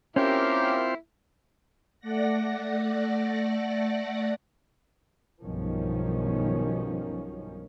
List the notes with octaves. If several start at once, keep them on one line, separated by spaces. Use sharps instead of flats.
A#3 C4 C#4 E4 F4 G4 A#4 C5
A3 D5 F#5 A#6
B1 G2 D#3 F3 C#4